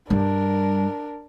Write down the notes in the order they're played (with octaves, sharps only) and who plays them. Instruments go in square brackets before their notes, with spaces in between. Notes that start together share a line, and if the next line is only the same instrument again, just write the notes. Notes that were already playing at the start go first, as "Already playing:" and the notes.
[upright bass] G2 G3 [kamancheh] D4 A#4